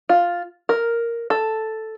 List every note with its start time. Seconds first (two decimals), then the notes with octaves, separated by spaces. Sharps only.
0.09 F4
0.69 A#4
1.30 A4